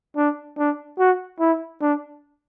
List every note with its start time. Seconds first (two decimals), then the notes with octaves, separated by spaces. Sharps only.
0.17 D4
0.58 D4
0.99 F#4
1.40 E4
1.81 D4